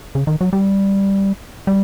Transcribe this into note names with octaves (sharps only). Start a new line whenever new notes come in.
C#3
D#3
F#3
G3
G3